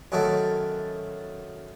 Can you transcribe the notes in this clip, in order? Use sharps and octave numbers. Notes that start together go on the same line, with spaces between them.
F#2 D#3 A3